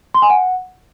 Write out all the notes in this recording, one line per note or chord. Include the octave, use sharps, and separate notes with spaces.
C6
G#5
F#5